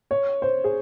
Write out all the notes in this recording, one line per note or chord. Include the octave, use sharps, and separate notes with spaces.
C#5
C5
G#4